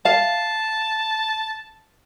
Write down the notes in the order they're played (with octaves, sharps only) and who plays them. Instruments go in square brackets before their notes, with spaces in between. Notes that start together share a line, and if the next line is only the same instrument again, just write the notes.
[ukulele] F5 [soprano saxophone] A5